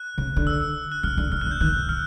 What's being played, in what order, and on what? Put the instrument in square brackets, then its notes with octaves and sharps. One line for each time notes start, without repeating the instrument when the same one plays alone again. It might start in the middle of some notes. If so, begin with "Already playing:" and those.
Already playing: [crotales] F#6
[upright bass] C#3
D3
[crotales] E6
F#6
[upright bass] C#3 [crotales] F6
[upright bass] D3
[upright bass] C#3 [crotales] F6
[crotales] F#6
[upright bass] D3
[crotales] G6
[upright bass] D#3 [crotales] F#6
[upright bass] A#2
[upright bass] A2 [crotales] F6